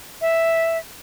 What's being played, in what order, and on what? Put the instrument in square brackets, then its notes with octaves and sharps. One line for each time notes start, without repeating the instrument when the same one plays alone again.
[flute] E5